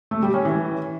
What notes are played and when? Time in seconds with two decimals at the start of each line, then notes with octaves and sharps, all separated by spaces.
0.11 A3
0.22 G3
0.34 C#4
0.45 E3